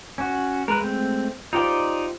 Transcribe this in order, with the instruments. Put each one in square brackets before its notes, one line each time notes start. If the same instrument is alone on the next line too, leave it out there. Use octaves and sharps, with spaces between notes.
[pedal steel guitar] C#4 F#4
[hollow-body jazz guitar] G#3 [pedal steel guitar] A#4 B4
[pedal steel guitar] A3 C4
[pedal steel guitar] D#4 D5 C6 [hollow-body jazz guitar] F4 G4 C5